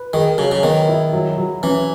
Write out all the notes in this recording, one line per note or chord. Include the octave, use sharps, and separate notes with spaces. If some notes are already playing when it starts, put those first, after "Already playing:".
Already playing: B4
D#3 G#4
C#3 F#3
C#3
D#3 B3
E4
F#3
F#3
E3 C#4